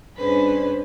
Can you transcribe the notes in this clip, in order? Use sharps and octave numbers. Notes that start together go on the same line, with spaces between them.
G2 C#4 D4 G#4 B4 C5